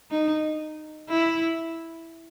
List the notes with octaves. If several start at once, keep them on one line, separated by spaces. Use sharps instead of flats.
D#4
E4